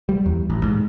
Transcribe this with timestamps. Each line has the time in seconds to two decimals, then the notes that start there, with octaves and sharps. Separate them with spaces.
0.09 G3
0.26 E2
0.50 A1
0.63 G#2